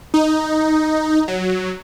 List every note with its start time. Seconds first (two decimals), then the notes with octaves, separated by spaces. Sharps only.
0.14 D#4
1.28 F#3